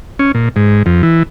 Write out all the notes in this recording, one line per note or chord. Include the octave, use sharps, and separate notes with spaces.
C#4
A#2
G#2
F2
E3